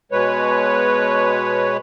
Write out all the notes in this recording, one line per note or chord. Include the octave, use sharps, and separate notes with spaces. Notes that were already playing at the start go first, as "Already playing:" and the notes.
B2 G#3 B4 C#5